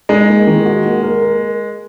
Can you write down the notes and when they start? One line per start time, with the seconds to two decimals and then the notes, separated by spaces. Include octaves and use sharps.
0.09 G#3 D#4
0.28 A#3
0.47 D#3
0.65 F#4
0.84 A#3
1.03 A#4
1.22 A#4